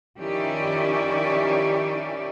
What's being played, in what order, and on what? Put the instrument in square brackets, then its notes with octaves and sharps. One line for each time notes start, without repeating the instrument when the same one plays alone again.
[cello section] D#3 F3 C#4 E4 G4 D5